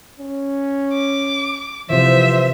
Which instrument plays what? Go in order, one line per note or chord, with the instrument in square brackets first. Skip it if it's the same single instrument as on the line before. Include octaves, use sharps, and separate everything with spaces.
[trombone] C#4
[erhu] D6
[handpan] C3 E3 [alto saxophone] F3 [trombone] C5 [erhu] E5